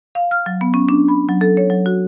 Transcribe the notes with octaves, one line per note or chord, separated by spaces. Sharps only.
F5
F6
F#3
B3
C#4
D4
B5
F#3
A4
C#5
F#3
F#4